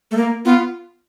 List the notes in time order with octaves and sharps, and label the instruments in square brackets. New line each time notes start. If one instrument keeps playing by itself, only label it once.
[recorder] A3
A#3
[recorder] B3 [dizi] F4